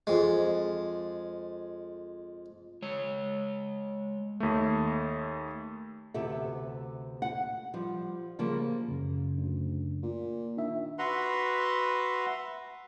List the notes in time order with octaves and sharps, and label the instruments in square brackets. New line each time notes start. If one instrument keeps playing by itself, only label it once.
[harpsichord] F2 G#3
[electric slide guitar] G#3 C#5
[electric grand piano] D#2 A3
[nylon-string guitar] D2 C3 B3 G4 A4 E5
F#5
F3 G3
C#3 F3 G3 A#3
[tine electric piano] F#2 C#3
[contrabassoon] D2
A#2
[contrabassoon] D#3 [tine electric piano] D4 E5
[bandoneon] F#4 B4 E5 F#5 A#5 C6